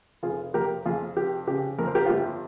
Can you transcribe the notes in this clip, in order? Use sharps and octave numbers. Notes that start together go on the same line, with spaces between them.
F1 F4 G#4
F2 G4 A#4
F2 F4 G#4
F1 G4
C#3 G4
F2 A#4
C5
G4 A#4
F4
G1 G4